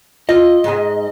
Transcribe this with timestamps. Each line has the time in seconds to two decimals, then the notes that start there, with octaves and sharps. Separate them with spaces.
0.29 F4 D#5
0.64 G#2 G#4